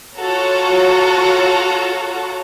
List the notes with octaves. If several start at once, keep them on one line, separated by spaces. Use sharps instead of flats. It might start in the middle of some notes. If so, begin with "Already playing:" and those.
F4 F#4 A4 C#5 F#5 A#5